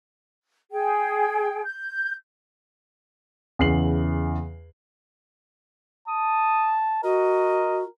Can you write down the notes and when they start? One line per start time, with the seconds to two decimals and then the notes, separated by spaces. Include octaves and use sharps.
0.72 G#4 G5
1.64 G6
3.59 E2 C#3 C7 F#7
6.08 A5 D#6
7.03 F#4 A#4 D#5